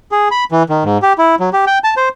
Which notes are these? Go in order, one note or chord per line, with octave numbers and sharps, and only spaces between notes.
G#4
B5
E3
D#3
G#2
G4
E4
F#3
G4
G5
A5
C5